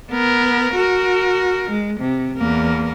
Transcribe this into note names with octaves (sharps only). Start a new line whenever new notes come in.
B3 A#4
F#4 A#4
G#3
C3
E2 A#3